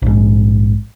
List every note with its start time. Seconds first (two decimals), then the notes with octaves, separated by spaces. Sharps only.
0.02 A#1 G#2